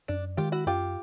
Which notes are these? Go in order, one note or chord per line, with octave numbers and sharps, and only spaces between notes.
F#2 D4
D#3 G#3 F4 G4
E4 F#4
F#2 F4 G4